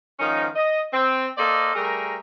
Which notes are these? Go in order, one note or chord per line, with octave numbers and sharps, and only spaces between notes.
G#2 D#3 F3 C#4 D#4
D#5
C4
A#3 A4 A#4 C5 D5 D#5
G3 A3 G4 G#4 A#4